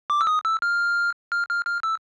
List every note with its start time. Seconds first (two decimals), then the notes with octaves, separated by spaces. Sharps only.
0.10 D6
0.21 E6
0.27 D#6
0.45 E6
0.62 F6
1.32 F6
1.49 F6
1.67 F6
1.83 E6